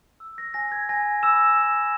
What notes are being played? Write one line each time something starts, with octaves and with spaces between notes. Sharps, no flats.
E6
A#6
G#5 A#6
G#6
G#5 A#6
B5 E6 E7
E6